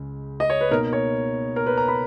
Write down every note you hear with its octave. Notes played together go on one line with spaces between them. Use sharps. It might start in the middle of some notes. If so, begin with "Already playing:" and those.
Already playing: C#2 C#3 G#3
D#5
C#5
B4
B2 A#3 D#4 A#4
C#5
A#4
B4
A#5
B5